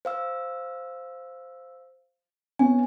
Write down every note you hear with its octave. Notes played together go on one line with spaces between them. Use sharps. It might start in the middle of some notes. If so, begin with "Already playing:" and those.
C5 F5 E6
B3 C#4 G#5